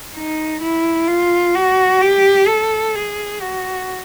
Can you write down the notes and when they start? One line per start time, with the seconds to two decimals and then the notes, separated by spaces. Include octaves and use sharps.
0.14 D#4
0.61 E4
1.08 F4
1.55 F#4
2.01 G4
2.48 A4
2.95 G#4
3.42 F#4